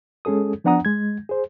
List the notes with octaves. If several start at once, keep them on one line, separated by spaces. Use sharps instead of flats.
G#3 C#4 G#4 A4 D#6
F3 B3 D4 F#5 A#5 D#6
G#3 G#6
G#4 C5